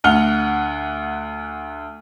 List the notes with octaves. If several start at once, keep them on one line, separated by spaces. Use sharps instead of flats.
D2 F#5 F6 G7